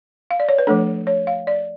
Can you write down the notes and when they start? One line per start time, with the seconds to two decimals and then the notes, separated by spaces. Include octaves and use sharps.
0.31 F5
0.40 D5
0.49 C#5
0.58 B4
0.67 F3 A3 D4 A4
1.07 C#5
1.27 F5
1.47 D5